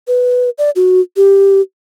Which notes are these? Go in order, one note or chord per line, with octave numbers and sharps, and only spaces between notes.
B4
D5
F#4
G4